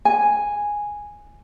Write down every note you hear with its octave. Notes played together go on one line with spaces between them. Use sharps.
G#5